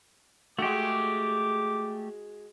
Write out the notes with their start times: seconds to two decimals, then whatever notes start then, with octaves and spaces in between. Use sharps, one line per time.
0.58 G#3 A3 F#4 G4 D6